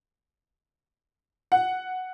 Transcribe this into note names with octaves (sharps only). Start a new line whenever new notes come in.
F#5